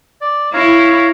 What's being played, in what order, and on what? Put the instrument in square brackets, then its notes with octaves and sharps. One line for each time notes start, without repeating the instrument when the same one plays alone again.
[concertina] D5
[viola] E4 [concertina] C#5 F5 A#5